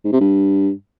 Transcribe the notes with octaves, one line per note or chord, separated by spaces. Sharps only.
G#2
C3
G2